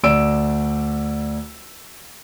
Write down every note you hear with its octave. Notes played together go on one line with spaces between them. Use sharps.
D2 D5 E6 D7 E7